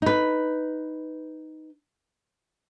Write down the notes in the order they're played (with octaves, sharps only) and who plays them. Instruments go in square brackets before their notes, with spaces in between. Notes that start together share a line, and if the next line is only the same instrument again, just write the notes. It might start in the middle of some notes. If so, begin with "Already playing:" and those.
[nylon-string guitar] D#4 B4